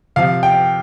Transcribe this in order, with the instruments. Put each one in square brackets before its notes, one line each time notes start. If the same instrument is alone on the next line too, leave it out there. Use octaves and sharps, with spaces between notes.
[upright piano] C3 F3 F5
G5